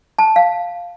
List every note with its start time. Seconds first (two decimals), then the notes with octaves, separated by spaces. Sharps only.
0.18 A5
0.36 F5